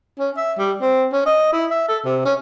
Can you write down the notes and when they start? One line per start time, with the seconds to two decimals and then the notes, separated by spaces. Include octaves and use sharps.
0.19 C#4
0.37 E5
0.58 G3
0.82 C4
1.13 C#4
1.26 D#5
1.52 E4
1.71 E5
1.89 A4
2.05 C3
2.25 C#4